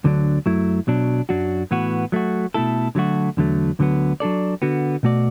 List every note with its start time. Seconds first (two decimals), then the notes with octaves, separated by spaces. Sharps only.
0.04 D2 D3 F#3 D4
0.46 F#2 F#3 A3 E4
0.87 B1 B2 F#3 D4
1.29 F#2 F#3 D4 F#4
1.71 A2 E3 B3 F#4
2.12 F#3 A3 F#4
2.54 B2 A3 E4 A4
2.95 D3 F#3 A3 F#4
3.37 E2 D3 F#3 A3
3.79 D2 D3 F#3 B3
4.20 F#3 D4 A4 D5
4.62 D3 B3 F#4
5.03 B2 A3 F#4 D5